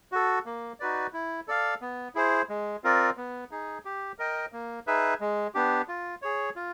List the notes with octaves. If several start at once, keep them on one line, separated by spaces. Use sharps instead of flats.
F#4 A4
A#3
D#4 F#4 B4 D5
E4
A4 D5 F5
B3
E4 G#4 C5
G#3
C4 F4 A#4 D5
B3
D#4 G#4
G4
A#4 D#5 G5
A#3
D#4 G#4 B4 E5
G#3
B3 D4 G4
F4
G#4 C#5
F4